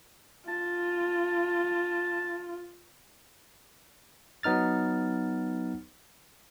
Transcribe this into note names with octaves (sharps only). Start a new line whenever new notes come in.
F4 A5
F#3 B3 D#4 F6 A6